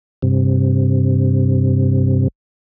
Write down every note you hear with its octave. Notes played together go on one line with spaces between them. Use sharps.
G2 C3